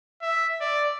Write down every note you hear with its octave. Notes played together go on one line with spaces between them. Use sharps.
E5
D5